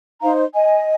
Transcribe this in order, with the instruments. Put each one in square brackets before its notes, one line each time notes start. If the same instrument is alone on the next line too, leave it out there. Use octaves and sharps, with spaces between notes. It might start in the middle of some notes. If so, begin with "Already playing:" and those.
[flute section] D#4 C5 F5 A#5
D#5 G#5